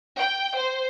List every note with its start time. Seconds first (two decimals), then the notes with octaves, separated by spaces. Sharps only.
0.17 G5
0.57 C5